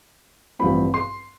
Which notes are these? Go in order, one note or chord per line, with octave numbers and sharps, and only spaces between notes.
A1 G2 F3 C4 B5
C6